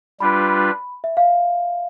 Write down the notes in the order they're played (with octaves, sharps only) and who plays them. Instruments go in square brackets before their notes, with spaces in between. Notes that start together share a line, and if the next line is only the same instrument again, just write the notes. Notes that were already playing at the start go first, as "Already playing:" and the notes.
[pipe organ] G3 D4 F4 B4 [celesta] B5
[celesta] E5
F5